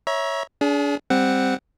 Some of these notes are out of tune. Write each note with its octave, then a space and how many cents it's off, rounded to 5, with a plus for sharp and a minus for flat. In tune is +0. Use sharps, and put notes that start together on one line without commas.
C#5 +0 E5 -10 A#5 +35
D4 -35 G#4 +20
G3 +15 C4 +0 F#5 +0